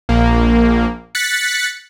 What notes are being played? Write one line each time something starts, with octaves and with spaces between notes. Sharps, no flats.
A#1 A#3
F#6 A6 B6 C#7